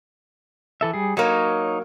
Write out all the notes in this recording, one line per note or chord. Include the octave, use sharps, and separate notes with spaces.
E3 A4 E5
G3 G#4
F#3 A#3 D#4 C#5